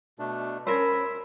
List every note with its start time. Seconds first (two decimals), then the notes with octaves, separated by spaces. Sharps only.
0.19 B2 A3 D4
0.67 C#4 A#4 C5 B5 E6